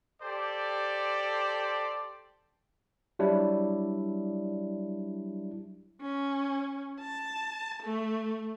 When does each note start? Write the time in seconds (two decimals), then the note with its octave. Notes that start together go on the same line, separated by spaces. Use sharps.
0.21 G4 A4 C5 D5
3.19 F#3 G3 D4 E4
6.02 C#4
7.01 A5
7.83 A3